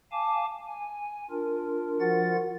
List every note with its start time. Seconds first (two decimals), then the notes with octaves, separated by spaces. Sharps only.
0.12 F5 G#5 A5 D6
0.67 G#5
1.30 D4 F4 A#4
2.00 F3 F4 F#4 A#4 F#5 A6